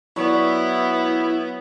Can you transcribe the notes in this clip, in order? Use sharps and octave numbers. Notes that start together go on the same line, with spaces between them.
F#3 B3 D4 E4 D5 F#5